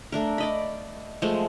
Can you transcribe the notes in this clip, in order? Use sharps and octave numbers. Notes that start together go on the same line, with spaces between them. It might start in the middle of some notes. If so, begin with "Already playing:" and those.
A3 D4 A#4
D5 D#5 B5
F3 G#3 A3